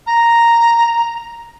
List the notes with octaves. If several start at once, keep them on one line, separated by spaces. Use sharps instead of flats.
A#5